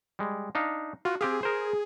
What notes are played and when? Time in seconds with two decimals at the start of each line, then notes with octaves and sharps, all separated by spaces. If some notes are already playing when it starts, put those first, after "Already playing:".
0.19 G3 G#3
0.55 D4 D#4 F5
1.05 F4 F#4
1.21 C4 G4 G#4 F5
1.43 A#4 C5